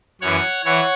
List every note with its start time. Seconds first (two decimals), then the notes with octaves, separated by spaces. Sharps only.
0.21 F#2 E3 C#5 F#5
0.65 E3 C#5 F#5